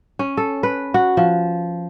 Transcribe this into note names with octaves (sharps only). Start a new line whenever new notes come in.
C#4
A4
B4
F#4
F3